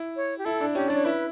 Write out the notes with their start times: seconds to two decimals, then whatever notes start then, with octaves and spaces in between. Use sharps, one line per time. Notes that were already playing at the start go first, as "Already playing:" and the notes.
Already playing: E4
0.16 C#5
0.38 G4
0.45 E4 A4
0.60 D4
0.75 C#4 G4
0.89 D4 D5
0.97 C#5
1.05 E4 B4